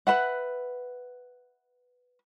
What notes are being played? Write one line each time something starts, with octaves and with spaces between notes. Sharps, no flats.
B4 E5 F#5